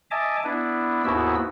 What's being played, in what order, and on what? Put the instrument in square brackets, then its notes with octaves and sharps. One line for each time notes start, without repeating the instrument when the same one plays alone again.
[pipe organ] D#5 E5 G#5 A5 D6
B3 D4 E4
D#2 G#2 B3 E4 F#4 E6